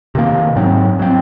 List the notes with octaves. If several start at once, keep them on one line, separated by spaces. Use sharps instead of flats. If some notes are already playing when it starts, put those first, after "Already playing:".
C3 D#3 A#3
G#2 F#3 C4
F#3 C4